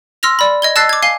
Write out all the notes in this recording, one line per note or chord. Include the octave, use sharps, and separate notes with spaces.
C6 E6 F6 A#6 F7
D5 B5
D#5 G#6 G7
D#5 A5 E6 F#6 A6 C7
D6 G#6
F5 G#5 C7 G7